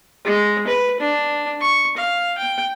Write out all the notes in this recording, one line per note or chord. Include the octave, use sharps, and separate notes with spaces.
G#3
B4
D4
C#6
F5
G5